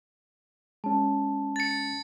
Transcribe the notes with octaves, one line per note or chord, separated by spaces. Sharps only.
G#3 C#4 A5
A6 C#7